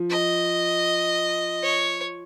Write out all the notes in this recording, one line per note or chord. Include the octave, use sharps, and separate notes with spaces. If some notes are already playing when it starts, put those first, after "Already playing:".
Already playing: F3
D#5
C#5